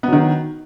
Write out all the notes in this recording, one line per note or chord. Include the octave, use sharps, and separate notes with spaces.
D#3 F#3 B3